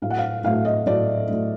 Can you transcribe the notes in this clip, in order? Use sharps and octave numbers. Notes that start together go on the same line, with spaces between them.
A2 F#3 A3 F5
F#5
F5
A2 F#3 A3 F5
D#5
A2 F#3 A3 D5
A2 F#3 A3